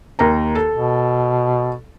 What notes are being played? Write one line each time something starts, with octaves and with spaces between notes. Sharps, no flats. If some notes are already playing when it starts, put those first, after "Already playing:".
D#2 A#4 A#5
A4
B2